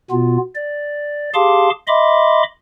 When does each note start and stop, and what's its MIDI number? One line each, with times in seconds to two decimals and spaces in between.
0.11 0.38 47
0.11 0.38 59
0.11 0.38 65
0.55 1.30 74
1.34 1.70 67
1.34 1.70 68
1.34 1.70 77
1.34 1.70 81
1.34 1.70 84
1.34 1.70 86
1.88 2.43 75
1.88 2.43 76
1.88 2.43 83
1.88 2.43 84
1.88 2.43 86